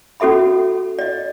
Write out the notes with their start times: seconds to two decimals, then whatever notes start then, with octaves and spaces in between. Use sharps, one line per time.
0.20 C#4 F#4 A4 E5 B5
0.99 D5 D#5